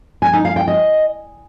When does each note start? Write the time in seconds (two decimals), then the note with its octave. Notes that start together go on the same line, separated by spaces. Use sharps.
0.22 G#5
0.33 D#4
0.45 F5
0.56 G5
0.67 D#5